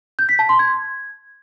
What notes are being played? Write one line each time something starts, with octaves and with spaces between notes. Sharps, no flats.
G6
B6
A5
C6
G#6